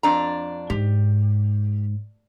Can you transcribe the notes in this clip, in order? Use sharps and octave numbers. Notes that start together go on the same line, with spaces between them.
F2 D4 A#5
G#2 G4